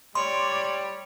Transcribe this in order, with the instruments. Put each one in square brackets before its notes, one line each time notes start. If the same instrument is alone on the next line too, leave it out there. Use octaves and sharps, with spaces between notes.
[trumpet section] G3 D5 [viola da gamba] C#5 [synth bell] C6